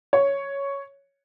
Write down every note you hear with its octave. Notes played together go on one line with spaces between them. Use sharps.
C#5